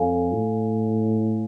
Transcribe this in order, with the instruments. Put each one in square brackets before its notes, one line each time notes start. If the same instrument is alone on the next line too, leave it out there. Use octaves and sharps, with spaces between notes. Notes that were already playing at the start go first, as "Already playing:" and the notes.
Already playing: [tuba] F2 [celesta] A4 C#5 F5 G#5
[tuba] A2